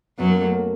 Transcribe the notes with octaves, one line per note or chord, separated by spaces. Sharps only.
F#2 F#3 B3
A#3
A3
A#3